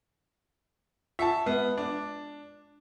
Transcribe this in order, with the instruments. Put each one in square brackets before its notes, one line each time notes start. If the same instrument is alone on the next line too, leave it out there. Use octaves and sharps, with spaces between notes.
[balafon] F4 F#5 [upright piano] E5 A5
[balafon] G#3 [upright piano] B3
[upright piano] D4